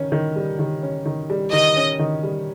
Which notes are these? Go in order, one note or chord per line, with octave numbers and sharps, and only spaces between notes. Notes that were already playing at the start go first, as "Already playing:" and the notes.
Already playing: D#3 C#4
D#3
G3
D#3
C#4
D#3
G3
D#3 D#5
C#4
D#3
G3